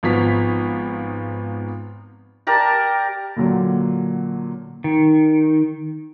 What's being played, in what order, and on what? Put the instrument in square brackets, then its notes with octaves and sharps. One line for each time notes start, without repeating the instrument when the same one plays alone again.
[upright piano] G#1 F3 B3 B6
[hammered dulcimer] G4 A#4 D5 A5
[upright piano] A#2 D3 F#3
[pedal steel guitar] D#3